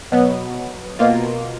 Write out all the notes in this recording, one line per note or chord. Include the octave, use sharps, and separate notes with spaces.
B2 F#3 B3
B2 A#3 F4